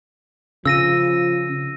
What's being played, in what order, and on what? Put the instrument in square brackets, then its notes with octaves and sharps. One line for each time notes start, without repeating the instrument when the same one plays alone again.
[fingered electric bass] C#3 [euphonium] F3 [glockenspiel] E6 A#6 D#7